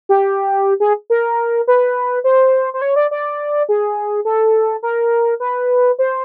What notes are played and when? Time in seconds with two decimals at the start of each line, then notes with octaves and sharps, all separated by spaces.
0.09 G4
0.80 G#4
1.10 A#4
1.67 B4
2.24 C5
2.74 C5
2.82 C#5
2.96 D5
3.11 D5
3.69 G#4
4.25 A4
4.83 A#4
5.40 B4
5.99 C5